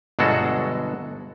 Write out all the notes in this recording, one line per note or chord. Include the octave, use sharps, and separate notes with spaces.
G1 B2 F#3 G#3 F#4 A4